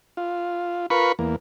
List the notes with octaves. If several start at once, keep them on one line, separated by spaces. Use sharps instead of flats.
F4
F4 A#4 B4 B5 C#6
E2 A#3